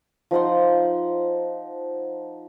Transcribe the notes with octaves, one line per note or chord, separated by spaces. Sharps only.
F3 D#4 F#5 C6